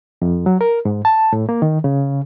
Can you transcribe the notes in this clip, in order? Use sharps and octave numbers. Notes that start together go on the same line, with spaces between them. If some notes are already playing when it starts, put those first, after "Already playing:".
F2
F#3
A#4
G#2
A5
A2
A#3
D#3
C#3